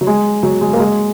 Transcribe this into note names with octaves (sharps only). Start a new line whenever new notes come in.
F#3
G#3
F#3
G#3
A#3
G#3